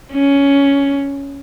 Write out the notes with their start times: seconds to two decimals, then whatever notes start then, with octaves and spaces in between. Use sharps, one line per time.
0.13 C#4